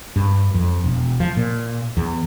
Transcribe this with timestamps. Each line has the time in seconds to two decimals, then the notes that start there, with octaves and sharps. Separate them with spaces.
0.16 G2
0.54 F2
0.84 E1
1.20 F3
1.37 A#2
1.97 E2